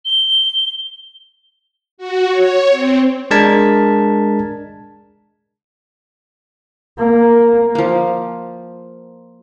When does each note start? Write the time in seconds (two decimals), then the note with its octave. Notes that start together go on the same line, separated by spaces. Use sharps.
0.05 G7
1.98 F#4
2.30 C#5
2.70 C4
3.31 G#3 D4 A#4 A5 G#6 B6
6.98 A#3
7.75 F3 A#3